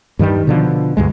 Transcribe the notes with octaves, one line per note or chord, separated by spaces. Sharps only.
G2 D#3 F#3 G3
B2 D3 F3
D2 G2 G#3